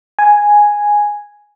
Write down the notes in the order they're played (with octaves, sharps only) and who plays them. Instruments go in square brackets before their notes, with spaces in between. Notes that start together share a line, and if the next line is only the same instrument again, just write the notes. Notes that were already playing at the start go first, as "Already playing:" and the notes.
[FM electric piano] G#5